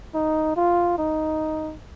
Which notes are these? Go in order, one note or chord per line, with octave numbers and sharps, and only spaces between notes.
D#4
F4
D#4